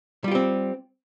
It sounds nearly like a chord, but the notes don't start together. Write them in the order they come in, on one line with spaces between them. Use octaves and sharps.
G3 F4 G4 C4